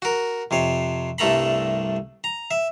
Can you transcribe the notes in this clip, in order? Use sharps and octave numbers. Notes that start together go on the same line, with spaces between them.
F#4 A#4
F2 C3 C#5
C2 G2 A3 A4 A#5 B5
A#5
E5